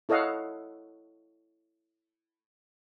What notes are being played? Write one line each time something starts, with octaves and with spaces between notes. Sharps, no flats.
E4 A4 C#5 D#5 F5 F#5